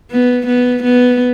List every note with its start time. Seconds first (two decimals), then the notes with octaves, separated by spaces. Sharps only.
0.11 B3
0.47 B3
0.83 B3